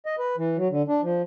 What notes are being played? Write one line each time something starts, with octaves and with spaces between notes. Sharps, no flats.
D#5
B4
E3
F#3
D3
D4
F3